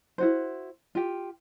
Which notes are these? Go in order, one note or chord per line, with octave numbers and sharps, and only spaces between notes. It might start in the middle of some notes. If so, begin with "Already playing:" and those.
E4 F#4 C5
F4 G4